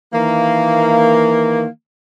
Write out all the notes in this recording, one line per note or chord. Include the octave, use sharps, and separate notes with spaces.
D#3 E3 A#3